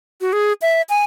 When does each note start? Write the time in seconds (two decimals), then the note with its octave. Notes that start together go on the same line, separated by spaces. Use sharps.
0.21 F#4
0.33 G#4
0.62 E5
0.89 G#5